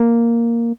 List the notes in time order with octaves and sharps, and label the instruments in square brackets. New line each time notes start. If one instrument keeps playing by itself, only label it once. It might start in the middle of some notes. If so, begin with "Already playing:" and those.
Already playing: [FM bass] A#3